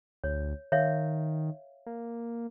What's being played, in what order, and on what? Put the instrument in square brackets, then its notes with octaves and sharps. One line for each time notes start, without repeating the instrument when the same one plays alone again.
[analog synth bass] D2 [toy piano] C#5
[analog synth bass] D#3 [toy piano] C#5 E5 F5
[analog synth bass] A#3